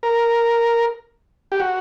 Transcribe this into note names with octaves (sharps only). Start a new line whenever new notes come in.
A#4
G4
F#4